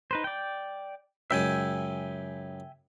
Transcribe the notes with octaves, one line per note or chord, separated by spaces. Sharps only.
D#4 B4 C5
D5 G5
C#2 F#2 G#3 E5 G5 G#5